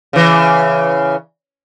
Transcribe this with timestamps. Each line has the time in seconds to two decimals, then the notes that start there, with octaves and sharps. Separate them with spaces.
0.13 C#3 E3